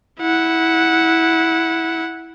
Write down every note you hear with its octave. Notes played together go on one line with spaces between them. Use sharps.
E4 F#5